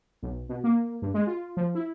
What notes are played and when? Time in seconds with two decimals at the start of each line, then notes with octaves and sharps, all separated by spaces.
0.22 B1
0.49 B2
0.64 A#3
1.02 G2
1.14 G#3
1.27 F4
1.57 F3
1.75 E4